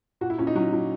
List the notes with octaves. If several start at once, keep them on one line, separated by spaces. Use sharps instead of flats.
A#2 F#4
E4
A#2 C#4
D#4
F#3 C#4
F#3